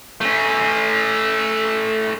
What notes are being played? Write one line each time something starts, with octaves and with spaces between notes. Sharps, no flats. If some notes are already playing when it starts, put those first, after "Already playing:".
A3 C#4